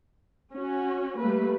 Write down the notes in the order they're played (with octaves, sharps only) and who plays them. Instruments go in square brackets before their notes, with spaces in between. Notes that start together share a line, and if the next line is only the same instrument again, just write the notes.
[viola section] C#4 F#4
G3 A3 A#3 B4